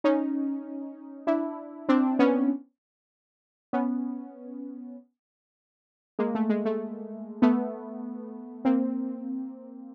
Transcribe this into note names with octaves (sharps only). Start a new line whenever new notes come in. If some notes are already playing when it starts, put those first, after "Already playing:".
C#4 D#4
D4 E4
C4 D4
B3 C#4
B3 C#4
G#3 A#3
A3
G#3
A3
A3 B3
A#3 C4